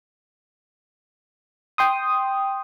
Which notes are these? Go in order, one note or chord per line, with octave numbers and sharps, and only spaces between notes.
G5 C6 D#6